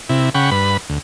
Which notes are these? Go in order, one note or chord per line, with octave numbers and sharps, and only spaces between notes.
C3 E4
C#3 F#5 G5 B5 C#6
G2 B4 B5
D2